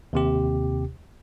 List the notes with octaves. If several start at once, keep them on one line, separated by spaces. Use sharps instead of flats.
D#2 C3 G4